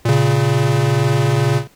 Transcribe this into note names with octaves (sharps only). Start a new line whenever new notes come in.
A#2 C#3